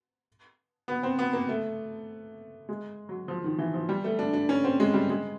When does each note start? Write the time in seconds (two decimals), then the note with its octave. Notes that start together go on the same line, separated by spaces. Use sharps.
0.88 B3
1.03 C4
1.19 B3
1.33 A#3
1.49 A3
2.69 G#3
3.09 F#3
3.28 F3
3.44 D#3
3.58 E3
3.74 F3
3.89 G3
4.04 A3
4.19 D4
4.33 D4
4.49 C#4
4.64 C4
4.80 G#3
4.94 G3
5.10 G#3